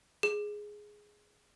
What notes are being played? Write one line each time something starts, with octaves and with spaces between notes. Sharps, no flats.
G#4